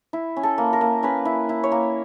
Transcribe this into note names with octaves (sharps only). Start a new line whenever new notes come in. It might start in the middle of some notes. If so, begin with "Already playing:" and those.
E4
C#4
A4
A#3
A#4
A#3
C#4 B4
E4
E4
C#5
A#3